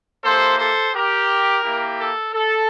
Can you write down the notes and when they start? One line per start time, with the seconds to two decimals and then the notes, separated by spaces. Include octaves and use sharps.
0.23 A#3 E4 G4 A4 C5
0.58 A4 C5
0.94 G4 A#4
1.63 A#3 E4 G4
1.99 A4
2.33 A4